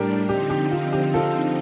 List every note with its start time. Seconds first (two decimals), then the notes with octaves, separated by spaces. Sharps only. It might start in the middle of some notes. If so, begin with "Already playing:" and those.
Already playing: A2 G3 D4 G4 A#4
0.29 D3 F3 C4 D#4 G4
0.50 G4
0.71 F4
0.93 G4
1.14 F4 A4